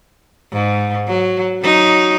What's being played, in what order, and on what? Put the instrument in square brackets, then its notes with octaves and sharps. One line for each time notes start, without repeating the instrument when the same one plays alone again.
[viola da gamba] G#2
F#3
F#3 D#4